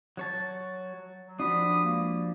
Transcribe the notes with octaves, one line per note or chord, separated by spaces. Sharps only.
F#3 C#5 A5
F#3
F3 D4 F#4 B5 D#6
C#2 A#3